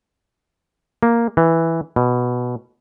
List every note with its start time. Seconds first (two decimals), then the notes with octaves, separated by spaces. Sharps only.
1.03 A#3
1.37 E3
1.96 B2